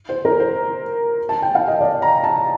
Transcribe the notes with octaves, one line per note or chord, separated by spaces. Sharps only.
C5
A#4
C5
A5
G5
F5
D#5
D5
A#5
A5